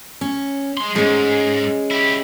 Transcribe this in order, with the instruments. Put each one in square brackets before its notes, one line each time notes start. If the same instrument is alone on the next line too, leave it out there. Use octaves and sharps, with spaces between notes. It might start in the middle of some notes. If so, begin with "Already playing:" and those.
[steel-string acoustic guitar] C#4
[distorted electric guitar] G#3 C6
[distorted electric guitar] G#2 [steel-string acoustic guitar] G#3 C#4
[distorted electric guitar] E4 G4